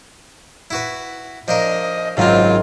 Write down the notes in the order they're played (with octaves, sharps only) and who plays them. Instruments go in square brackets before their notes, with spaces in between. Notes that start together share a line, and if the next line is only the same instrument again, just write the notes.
[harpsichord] E4 F#4 B4
[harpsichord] F3 D4 A#4 [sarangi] D#5
[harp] G#1 [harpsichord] F#2 F#3 C4 [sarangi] F4